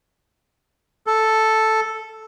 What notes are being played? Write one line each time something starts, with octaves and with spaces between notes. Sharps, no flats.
A4